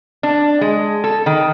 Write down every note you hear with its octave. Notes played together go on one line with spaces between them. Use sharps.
D4
G#3
A4
D#3